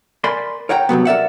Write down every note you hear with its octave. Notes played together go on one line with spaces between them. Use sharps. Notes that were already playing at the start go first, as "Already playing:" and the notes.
A#4 D5 G#5 B5 C6
A#4 C#5 F#5 G5 A#5
G2 C3 F#3 B3
A#4 D5 E5 F#5